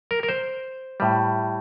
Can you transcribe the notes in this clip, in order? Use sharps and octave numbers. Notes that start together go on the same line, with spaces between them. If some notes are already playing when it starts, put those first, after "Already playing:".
A#4
A#4
C5
A2 G3